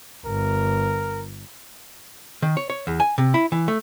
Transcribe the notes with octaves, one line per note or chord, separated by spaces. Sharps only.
G1 A#4
D#3
C#5
C#5
E2
G#5
C3
E4
E3
A3